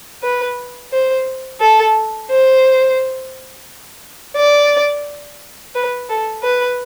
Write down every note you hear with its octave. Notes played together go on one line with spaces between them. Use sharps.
B4
C5
A4
C5
D5
B4
A4
B4